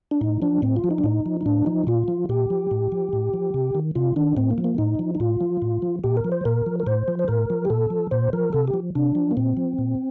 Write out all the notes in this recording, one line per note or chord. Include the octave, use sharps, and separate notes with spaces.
D4
A2 D#4
F3 D4
A2 C4
F4
F3
D#4
D4
A2 D#4
F3
D#4
A2 D4
F3 D#4
A#2 F4
F3
A#2 G4
F3
A2
F3
A2
F3
C3
D#3
C3 F4
D#3 D4
A2 C4
A#3
F3
A#3
A2 D#4
F3
D#4
A2 F4
F3
A2
F3
A#2 G4
A#4
F3
C5
A#2 A#4
F3
A#4
A2 C5
F3
C5
A2 A#4
F3
G4
A#2 A4
F3
A#2 C5
F3 A#4
C3 A4
G4
F3
C3 D4
F3
A#3
A#2 C4
F3
A#2